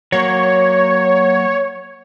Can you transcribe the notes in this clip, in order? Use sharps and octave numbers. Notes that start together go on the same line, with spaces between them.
F#3 A#3 C#5